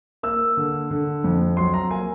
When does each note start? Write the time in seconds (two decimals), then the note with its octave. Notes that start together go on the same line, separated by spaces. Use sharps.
0.23 A#3 E6
0.57 D3
0.90 D3
1.24 F2
1.57 F#3 C6
1.74 A#5
1.91 A#3 G#5